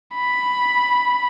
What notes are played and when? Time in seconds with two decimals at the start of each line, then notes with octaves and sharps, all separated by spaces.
0.15 B5